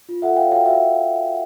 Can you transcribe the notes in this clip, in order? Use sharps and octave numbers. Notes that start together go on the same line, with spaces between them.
F4
A4 E5 F#5
C#5 F5 G5
F#4 F5 G5
F#4 E5